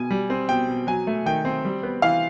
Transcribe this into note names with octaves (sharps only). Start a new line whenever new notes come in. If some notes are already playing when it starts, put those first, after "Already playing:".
Already playing: B2 G#5
G3
C4
B2 G5
B2
F#3 G#5
A3
D#3 G5
C4
G3
B3
E3 F5